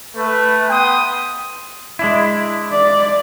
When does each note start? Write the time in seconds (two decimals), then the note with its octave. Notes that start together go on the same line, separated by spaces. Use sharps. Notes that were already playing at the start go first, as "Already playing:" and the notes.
0.16 A3 B4
0.69 B3 G5 C6 D#6
1.99 G#3 D4 E4
2.72 D5